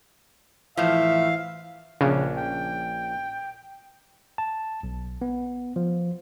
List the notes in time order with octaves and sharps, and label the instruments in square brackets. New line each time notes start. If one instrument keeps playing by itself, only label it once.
[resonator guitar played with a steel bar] A2 F3 [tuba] E3 [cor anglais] E5 [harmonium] F5
[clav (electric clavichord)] A#1 C#4 D4 [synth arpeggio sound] C#3
[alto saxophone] G5
[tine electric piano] A5
B1
B3
F3